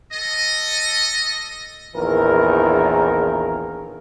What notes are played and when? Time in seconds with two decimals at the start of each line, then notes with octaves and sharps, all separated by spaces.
0.12 A4 D#5
1.95 A#1 E2 D#3 E3 A#4